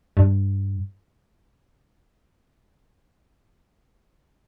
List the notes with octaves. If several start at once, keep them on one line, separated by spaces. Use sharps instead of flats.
G2